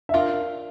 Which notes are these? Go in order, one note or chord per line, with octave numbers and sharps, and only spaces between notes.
E5
D4 F4 A#4 F5